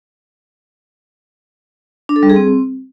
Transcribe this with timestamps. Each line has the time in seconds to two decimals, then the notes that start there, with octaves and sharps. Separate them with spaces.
2.09 D4
2.16 A4
2.23 G3
2.30 G#4
2.36 C4